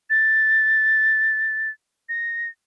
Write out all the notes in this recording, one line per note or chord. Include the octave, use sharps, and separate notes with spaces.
A6
A#6